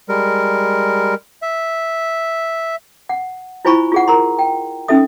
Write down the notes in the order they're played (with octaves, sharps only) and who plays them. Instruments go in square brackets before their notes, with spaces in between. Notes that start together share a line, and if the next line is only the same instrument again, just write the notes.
[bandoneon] G3 G#3 A#4
E5
[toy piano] F#5
E4 F4 C5 G#5 B5 C#6
F4 G#4 F#5
A#4 A#5 C6
G5
C#4 D#4 A4 E5 D#6